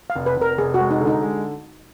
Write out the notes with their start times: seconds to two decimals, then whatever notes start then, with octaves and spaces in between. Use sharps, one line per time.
0.10 F5
0.15 F1
0.26 B4
0.37 F1
0.42 A#4
0.58 F1 G#4
0.74 F#4
0.80 G#3
0.91 D#4
1.01 D3
1.07 D#4
1.22 G#3